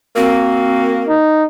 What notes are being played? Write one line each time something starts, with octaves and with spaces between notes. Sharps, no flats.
A#3 C4 F#4
D#4